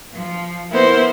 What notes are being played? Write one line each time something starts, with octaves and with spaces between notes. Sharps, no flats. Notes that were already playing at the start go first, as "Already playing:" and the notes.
F3
B3 E4 A#4 C5